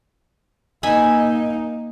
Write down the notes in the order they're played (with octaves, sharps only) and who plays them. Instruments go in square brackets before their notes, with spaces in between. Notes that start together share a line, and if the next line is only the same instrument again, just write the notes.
[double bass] A#3 D#4 [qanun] E5 G#5 B5